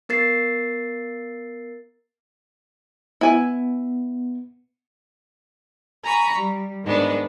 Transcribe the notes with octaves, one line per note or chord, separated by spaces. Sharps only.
B3 A#4 A6 C7
B3 E4 G#5
G#5 A#5 B5 C#6
G3
G#2 D#3 B3 D4